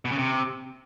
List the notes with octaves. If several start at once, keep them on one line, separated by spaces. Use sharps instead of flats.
B2
C#3
C3